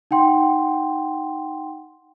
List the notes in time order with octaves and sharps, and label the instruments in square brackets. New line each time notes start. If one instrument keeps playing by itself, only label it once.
[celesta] D#4 F#5 G5 C6